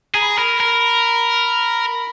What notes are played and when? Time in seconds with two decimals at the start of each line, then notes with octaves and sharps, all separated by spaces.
0.15 G#4 A#5
0.21 B5
0.29 A#5
0.37 A#4 B5
0.60 A#4